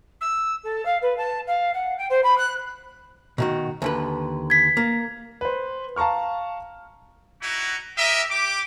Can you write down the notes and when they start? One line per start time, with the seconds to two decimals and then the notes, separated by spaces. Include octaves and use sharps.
0.20 E6
0.63 A4
0.85 F5
1.01 B4
1.17 A5
1.47 F5
1.73 F#5
1.98 G5
2.10 C5
2.23 B5
2.37 F#6
3.38 B2 D#3 F#4
3.82 D#2 D3 B4
4.50 G#6 B6
4.77 A#3
5.41 B4 C5
5.96 F5 A5 A#5 C#6 F6
7.42 D#4 E4 F#4
7.97 G4 A#4 D#5 E5
8.31 G4 D6